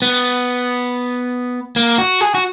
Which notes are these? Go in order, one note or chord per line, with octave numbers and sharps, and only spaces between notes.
B3
A#3
F#4
G#4
F#4